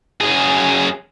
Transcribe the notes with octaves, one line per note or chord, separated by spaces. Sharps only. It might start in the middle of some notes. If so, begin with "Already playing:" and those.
F#2 G#4